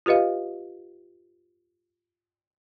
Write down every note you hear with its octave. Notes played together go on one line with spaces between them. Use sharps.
F4 G4 B4 D#5 F5